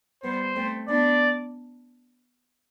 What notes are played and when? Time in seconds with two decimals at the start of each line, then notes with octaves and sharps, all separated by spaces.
0.23 G3 B3 C5
0.56 A3 C4
0.88 B3 D4 D5